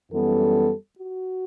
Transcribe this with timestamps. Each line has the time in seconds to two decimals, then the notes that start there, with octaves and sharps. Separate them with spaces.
0.11 F#2 E3 G3 B3 A4
0.99 F#4